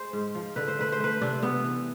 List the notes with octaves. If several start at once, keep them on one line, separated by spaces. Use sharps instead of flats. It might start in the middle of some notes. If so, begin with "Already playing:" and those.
Already playing: G#3 C5
G#2
F3
D3 B4
C5
A3 B4
C5
A3 B4
C3 D4
C3 B3
E3